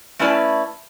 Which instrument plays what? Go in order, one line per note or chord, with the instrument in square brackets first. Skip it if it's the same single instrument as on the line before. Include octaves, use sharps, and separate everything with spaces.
[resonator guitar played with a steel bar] A3 C#4 E4 B4 D5 A5